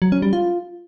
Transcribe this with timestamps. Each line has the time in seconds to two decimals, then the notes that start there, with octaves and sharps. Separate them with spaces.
0.02 F#3
0.12 C#4
0.22 G3
0.33 F4